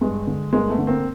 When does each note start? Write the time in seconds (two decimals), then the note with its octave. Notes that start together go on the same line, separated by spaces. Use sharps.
0.01 G2 G#3
0.27 D3
0.53 G2 G#3 A#3
0.69 A3 B3
0.78 D3
0.87 A#3 C4